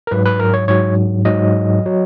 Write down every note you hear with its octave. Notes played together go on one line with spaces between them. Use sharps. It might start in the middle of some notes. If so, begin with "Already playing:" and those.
A#4
G#2 F#3 B4
B4
A#4
C#5
G#2 F#3 C#5
G#2 F#3 D#5
F#3